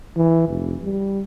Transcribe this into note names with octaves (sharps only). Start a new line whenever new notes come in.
E3
F1
G3